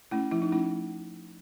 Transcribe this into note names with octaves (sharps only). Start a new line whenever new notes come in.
A3 C#4 E4
F3 E4
D#4
A3 C#4 E4